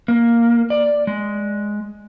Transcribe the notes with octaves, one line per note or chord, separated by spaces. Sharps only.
A#3
D5
G#3